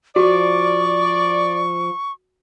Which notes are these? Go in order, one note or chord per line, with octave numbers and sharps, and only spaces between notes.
F3 F#4 D5 C#6